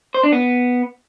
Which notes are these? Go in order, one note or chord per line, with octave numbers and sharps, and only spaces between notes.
C5
D4
B3